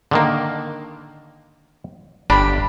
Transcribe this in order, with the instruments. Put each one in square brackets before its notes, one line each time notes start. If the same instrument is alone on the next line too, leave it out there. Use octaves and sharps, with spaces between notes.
[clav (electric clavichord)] D3 D#3 A#3
[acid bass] G1 [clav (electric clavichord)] D4 G4 [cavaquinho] B5